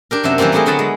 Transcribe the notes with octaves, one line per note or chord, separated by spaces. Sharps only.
D4 G4 A#4
F#2 C3 F#3 E5
E3 F3 G3 A#3 C4
F#3 A3 E4 G4 G#4 A#4
D3 F#3 B3 F#5 A5 B5
G#3